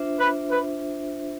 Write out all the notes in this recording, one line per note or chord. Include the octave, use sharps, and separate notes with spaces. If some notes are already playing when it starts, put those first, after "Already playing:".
Already playing: D4 F4 C5 E5
B4
B4